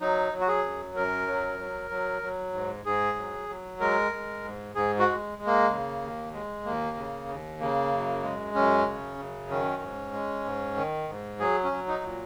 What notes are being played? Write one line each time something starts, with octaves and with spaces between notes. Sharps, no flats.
F#3 D#4
F#3
F#4
G#4
F#2
F#2 A#4
F#3
F#3
F#3
F#3
G#2
G#2 G#4
F#3
F#3
G#3 A#4
G#3
G#2
G#2 G#4
F#4
G#3
G#3
A#3
C#3
D#2
G#3
D#2 A#3
C#3
D#2
C#3 A#3
F#2
G#3
F#2 C#4
C#3
F#2
D#3 C#4
G#2
G#3
G#2
D#3
G#2
F#3 G#4
C#4
F#3
D#4
A#2